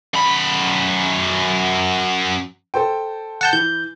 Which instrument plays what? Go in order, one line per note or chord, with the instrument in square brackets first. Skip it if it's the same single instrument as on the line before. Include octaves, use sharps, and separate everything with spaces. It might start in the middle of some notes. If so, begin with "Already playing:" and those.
[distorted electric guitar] F#2 B5
[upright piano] A4 C5 G5
[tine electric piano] F#5 A5 G6
[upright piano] E3 [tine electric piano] G6